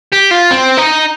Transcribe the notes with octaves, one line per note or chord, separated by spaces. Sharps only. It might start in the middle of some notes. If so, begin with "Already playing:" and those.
G4
F4
C4
D#4